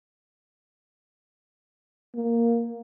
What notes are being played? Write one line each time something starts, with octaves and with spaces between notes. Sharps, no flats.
A#3